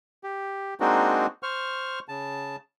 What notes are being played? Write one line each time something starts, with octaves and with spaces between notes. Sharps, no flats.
G4
G#3 A#3 C4 D4 D#4 F#4
C5 C#6 F6
C#3 A5